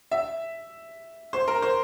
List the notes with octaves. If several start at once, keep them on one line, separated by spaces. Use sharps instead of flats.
E5
C5
A#4
C5